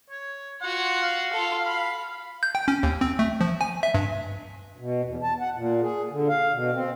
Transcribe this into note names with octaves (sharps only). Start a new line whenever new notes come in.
C#5
F4 F#4 F#5
F5
F4 A4
B5
G6
G5
C#4
D#2
C4
A3
F3
G#5
E5
G2
B2
E2
A5
F#5
A#2
G#4
D3
F5
B2
C4